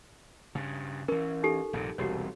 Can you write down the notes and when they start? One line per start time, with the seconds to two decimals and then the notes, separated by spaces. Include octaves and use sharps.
0.55 G2 C#3
1.08 E3 C#4 A#4
1.43 D#4 G4 A4
1.73 A#1 G2 C3
1.98 E1 C2 F#4 G4 C#5